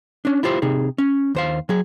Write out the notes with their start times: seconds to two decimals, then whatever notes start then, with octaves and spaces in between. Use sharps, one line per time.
0.25 C#4 D4
0.43 E4 F4 G4 C5 E5
0.62 C3 D#4 G#4
0.98 C#4
1.35 D#2 C5 F5
1.69 F#3 G#4